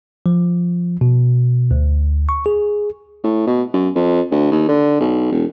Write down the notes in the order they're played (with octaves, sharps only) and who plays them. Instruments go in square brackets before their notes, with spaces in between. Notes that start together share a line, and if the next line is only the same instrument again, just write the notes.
[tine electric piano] F3
B2
D2
C#6
G#4
[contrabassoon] A2
B2
F#2
F2
D2
D#2
D3
B1
E1